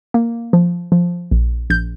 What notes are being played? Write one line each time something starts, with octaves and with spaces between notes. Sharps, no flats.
A#3
F3
F3
A#1
A#1 G6